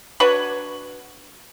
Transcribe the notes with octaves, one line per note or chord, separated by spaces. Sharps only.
D4 F#4 B4 C#5